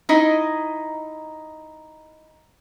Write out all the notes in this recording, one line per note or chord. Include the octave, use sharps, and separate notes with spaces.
D#4 E4 D#5